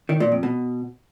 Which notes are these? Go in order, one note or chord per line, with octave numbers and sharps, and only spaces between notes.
D#3
A#2
F2
B2